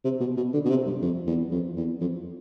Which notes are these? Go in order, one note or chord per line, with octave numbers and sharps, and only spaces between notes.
C3
B2
B2
D3
B2
C3
G2
F2
E2
F2
E2
F2